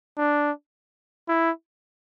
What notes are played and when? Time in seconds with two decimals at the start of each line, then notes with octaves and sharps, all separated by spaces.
0.18 D4
1.28 E4